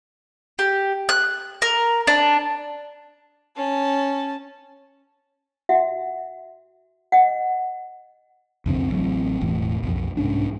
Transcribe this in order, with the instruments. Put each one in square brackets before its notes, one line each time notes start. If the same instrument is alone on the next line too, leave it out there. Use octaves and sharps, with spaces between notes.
[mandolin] G4
F#6
A#4
D4
[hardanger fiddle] C#4 A5
[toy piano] F#4 E5 F#5
D#5 F#5
[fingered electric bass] C2 F2 D3 C4
A1 F#3 C4
E1 E2 A2
B1 F2
C2 G#2 C#4 D4